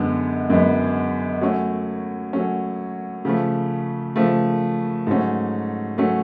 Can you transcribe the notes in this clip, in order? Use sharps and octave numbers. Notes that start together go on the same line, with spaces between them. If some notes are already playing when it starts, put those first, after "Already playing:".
Already playing: F#2 D3 G#3 B3
F#2 D3 G#3 B3
F#3 A3 C#4
F#3 A3 C#4
C#3 F3 A3
C#3 F3 A3
G#2 F#3 A3 C#4
F#3 A3 C#4